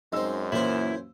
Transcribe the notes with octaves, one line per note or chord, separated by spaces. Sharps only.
F#2 G#3 C4 D#4 E6
A#2 E3 A#3 C#4 E4 C5